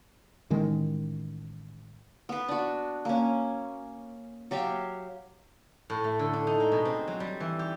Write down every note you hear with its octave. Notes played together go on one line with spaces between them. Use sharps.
A1 D#3 G#3
B3 B4
D4 F#4
A#3 C#4
F#3 G4 E5 F5
A2
A3
D3
D4
D#4
G#3
B2
C4
F#3
G3
E3
G4